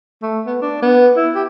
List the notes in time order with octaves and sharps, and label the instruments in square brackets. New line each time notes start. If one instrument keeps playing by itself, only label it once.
[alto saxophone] A3
B3
D4
B3
E4
G4